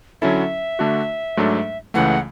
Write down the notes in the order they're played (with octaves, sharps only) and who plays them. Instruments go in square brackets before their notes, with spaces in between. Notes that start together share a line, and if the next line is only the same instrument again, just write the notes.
[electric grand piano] D3 F#3 C#4 E4 A4 [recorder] E5
[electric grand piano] D3 A3 D4 F#4
G#2 F#3 A3 D4 A4
[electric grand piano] C#2 C#3 E3 A3 [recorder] F#5